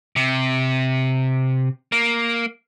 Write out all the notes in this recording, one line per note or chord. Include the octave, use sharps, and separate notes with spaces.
C3
A#3